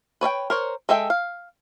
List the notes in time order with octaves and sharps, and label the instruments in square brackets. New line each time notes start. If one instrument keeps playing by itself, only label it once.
[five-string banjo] B4 C#5 D5 G5
A#4 C5 C#5
G#3 A4 E5 G5
F5